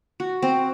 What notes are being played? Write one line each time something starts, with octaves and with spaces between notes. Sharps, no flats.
F#4
C4